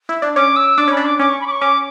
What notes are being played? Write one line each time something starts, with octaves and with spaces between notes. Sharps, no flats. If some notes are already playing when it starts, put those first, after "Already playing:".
E4
D4
C#4 D6
E6
D4 D6
C#4 B5
D4
D6
C#4 D6
C#6
B5
D6
C#6
C#4 D6